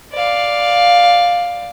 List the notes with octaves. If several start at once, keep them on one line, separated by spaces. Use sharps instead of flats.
D5 F5